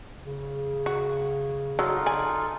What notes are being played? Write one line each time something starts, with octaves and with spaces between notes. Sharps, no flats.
C#3
F#4
F#3 D#4 F4 A4
D5 G#5